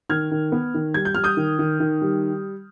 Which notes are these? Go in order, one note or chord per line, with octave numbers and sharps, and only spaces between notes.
D#3 F6 G#6
D#3
B3
D#3
G3 G#6
G6
G3 F6
D#6 G6
D#3
D#3
D#3
G3